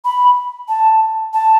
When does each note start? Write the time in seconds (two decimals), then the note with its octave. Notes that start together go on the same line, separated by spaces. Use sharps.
0.05 B5
0.69 A5
1.33 A5